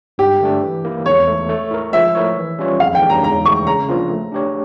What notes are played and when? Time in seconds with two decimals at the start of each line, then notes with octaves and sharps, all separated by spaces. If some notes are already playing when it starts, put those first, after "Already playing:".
0.18 G2 G4
0.41 D3 A3 D4
0.63 E3
0.85 A#3 E4
1.06 E2 C#5
1.27 E3 A3
1.49 A3
1.71 E4 A#4
1.92 F3 E5
2.15 A3 E4 A#4 C#5
2.37 E3
2.59 G3 C#4 F4 C#5
2.80 F2 F5
2.95 G5
3.01 E3 A#3 D4 G4
3.10 A#5
3.24 E2 A#5
3.45 E3 A3 E4 C#6
3.67 C#3 A#5
3.88 F3 A#3 D4 F4
4.10 A3
4.32 D4 G4 C#5